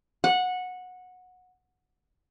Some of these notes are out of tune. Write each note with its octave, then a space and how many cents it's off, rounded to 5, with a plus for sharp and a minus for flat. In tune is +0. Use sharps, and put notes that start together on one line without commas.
F#5 -15